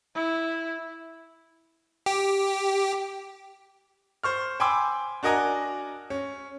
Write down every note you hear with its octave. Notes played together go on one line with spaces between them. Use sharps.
E4
G4
C5 C#6 F6
G5 G#5 B5 C6 D6 E6
D4 F#4 A#4 D#5 G#5 A#5
C#4